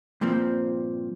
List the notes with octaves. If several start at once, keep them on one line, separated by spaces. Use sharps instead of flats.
G2 A#2 F3 C4